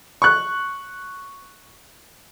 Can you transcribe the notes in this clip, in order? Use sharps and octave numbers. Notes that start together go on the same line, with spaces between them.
C#6 F#6